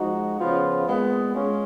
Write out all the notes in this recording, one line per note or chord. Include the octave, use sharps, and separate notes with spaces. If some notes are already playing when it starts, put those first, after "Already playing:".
Already playing: F3 G#3 D#4 F#4
C#3 F3 B3 F4
A#2 G#3 B3
G#3 C#4 F4